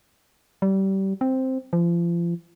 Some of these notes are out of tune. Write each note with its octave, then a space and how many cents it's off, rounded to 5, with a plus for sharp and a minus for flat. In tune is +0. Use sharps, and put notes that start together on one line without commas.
G3 -25
C4 +0
F3 -35